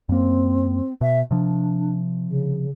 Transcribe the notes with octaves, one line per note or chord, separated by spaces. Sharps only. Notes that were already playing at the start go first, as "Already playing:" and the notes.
F#2 A#3 C4
B2 E5
C3 F3 D4
C#3